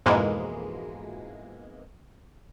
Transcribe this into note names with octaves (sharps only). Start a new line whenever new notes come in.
F2 G#2 B2 E3 G#3 A#3